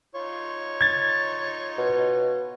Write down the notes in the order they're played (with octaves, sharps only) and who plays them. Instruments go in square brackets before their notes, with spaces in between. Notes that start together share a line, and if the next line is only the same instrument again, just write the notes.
[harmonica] D#4 F4 C#5
[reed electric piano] G#6 A6
[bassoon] B2